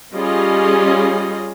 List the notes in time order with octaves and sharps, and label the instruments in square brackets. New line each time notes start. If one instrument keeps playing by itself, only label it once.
[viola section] G3 C#4 F4 G#4 D#5